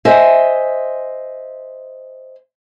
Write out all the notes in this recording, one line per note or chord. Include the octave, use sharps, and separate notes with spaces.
C5 D#5 E5 G#5